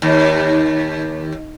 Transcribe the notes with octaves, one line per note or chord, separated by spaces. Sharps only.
D#2